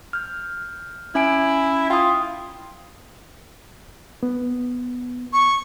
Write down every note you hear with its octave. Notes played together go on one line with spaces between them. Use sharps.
F6 G6
C#4 E4 G#5 D7
F4 G5 D#6
B3
C#6